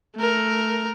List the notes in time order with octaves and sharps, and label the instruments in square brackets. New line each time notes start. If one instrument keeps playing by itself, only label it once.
[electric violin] A3 A#4